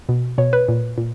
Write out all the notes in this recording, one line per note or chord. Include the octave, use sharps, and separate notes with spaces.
B2
B2 C#5
B4
A#2
A#2